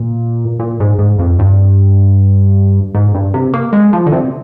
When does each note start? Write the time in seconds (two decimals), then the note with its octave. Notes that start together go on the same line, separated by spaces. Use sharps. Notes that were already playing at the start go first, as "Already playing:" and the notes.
Already playing: A#2
0.59 A#2
0.80 G#2
0.99 G#2
1.19 F2
1.39 G2
2.95 G#2
3.15 G2
3.34 C3
3.54 A#3
3.73 G#3
3.93 F3
4.06 D3
4.12 C3